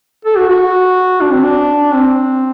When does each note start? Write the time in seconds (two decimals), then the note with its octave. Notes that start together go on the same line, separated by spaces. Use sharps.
0.25 A4
0.37 F#4
0.49 F#4
1.21 D4
1.32 C4
1.43 D4
1.93 C4